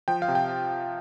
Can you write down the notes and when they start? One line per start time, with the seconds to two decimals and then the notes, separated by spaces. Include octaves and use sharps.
0.08 F3 G5
0.22 F5
0.28 C3
0.35 G5